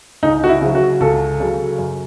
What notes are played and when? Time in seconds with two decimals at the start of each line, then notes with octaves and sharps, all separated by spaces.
0.23 C#2 D#4
0.44 F#4
0.49 E4
0.61 C#3 F#3
0.75 F#4
1.01 C#2 A4
1.40 C#3 F#3
1.78 F#2